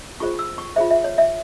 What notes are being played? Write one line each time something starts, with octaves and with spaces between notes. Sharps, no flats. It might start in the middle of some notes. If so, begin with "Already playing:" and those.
F4 G#4 C5 C#6
E6
C#6
F4 G#4 C5 E5
E5
C#5
E5